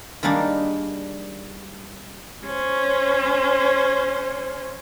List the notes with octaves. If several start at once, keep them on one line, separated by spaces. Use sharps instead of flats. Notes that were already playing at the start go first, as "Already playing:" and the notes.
D#3 G3 A#3 D4 G#4
C#4 C5